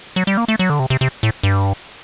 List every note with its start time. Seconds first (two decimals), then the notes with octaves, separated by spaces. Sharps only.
0.16 F#3
0.27 G3
0.37 A#3
0.48 A3
0.59 F#3
0.70 D3
0.80 C3
0.90 C3
1.01 C3
1.23 A2
1.43 G2